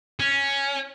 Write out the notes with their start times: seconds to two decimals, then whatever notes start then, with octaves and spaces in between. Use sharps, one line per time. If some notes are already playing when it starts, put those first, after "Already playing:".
0.20 C#4